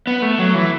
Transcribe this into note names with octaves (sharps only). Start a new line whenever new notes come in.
B3
A3
F#3
E3